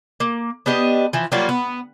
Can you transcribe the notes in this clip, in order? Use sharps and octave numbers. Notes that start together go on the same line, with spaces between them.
A#3
B3 D4 G4 D#5
E3 F3
F#3 G3 A#3 F4
B3